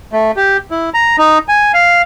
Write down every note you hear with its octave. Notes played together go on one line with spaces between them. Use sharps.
A3
G4
E4
A#5
D#4
G#5
F5